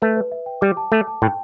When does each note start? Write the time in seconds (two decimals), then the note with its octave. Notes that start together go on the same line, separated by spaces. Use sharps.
0.02 A3 B4
0.17 B4
0.32 E5
0.46 G5
0.61 G3 D6
0.77 A5
0.92 A3 D6
1.07 A5
1.22 A2 G5